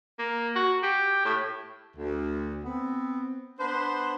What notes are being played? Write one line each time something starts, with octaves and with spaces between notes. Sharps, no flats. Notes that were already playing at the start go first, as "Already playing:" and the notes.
A#3
F#4
G4
A2
D2
B3 C4
B3 D4 B4 C5